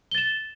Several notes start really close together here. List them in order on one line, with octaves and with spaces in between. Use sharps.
G7 A6 E7